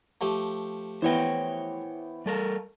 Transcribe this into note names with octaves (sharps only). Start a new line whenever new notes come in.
F3 A3 G4
E3 B3 C5 C#5 G5
G3 A4 A#4